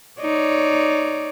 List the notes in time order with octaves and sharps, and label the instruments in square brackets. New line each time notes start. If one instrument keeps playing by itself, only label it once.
[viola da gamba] D#4 C#5 D5